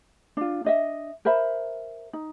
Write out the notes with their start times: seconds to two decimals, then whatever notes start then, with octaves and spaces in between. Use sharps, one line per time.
0.37 D4 F4
0.65 D4 D#5 E5
1.25 A#4 C5 E5 B5
2.13 D#4